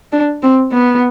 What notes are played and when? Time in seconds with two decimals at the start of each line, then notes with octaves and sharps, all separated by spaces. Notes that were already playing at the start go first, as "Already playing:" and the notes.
0.12 D4
0.42 C4
0.72 B3